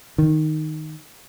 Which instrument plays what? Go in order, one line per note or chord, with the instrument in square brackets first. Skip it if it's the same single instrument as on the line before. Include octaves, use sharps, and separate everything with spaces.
[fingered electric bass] D#3